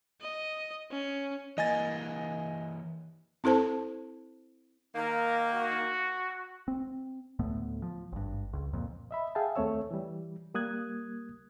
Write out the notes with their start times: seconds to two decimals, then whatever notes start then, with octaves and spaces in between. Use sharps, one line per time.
0.21 D#5
0.90 C#4
1.58 E3 A#3 D#5 G#5 A6
3.44 C4 E4 A4 C5 A5
4.95 D#3 A#3 A#4
5.53 F#4
6.68 C4
7.39 D2 A2 A3 B3
7.82 F3
8.12 G#1 G2
8.53 C#2
8.73 F2 A#2
9.11 D#5 E5 B5
9.35 G#4 E5 F5 G5 A5
9.55 D#2 A3 C4 C#5 E6
9.91 E3 G3
10.54 G3 A#3 D#6 F#6 G#6